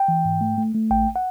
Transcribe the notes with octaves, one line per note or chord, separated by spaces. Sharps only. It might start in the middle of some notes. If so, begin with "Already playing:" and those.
Already playing: G5
E3
G#2
A3
A3
A3
A1 G5
F#5